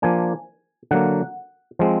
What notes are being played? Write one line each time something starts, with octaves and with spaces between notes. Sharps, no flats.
F3 A#3 D4 G#5
D3 F#3 A#3 F#5
F3 G#3 C4